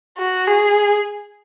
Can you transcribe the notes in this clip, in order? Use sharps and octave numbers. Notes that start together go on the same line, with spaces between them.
F#4
G#4